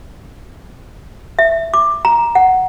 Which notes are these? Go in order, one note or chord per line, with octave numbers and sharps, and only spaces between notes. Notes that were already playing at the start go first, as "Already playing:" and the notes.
E5
D6
A#5
F#5